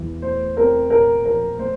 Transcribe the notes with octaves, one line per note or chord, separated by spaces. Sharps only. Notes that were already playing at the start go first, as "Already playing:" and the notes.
Already playing: E2 E3
A3 C5
C4 A#4
A#2 A#4
F3 A#4
A3 C5